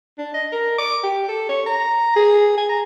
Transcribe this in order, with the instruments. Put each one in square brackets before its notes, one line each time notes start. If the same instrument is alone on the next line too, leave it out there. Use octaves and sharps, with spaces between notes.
[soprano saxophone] D4
D#5
A#4
D6
G4
A4
C#5
A#5
G#4
G#5
A#5